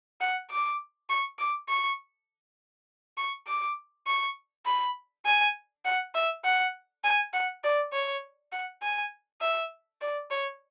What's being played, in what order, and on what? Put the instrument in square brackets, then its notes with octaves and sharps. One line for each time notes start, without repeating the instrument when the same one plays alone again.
[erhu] F#5
D6
C#6
D6
C#6
C#6
D6
C#6
B5
G#5
F#5
E5
F#5
G#5
F#5
D5
C#5
F#5
G#5
E5
D5
C#5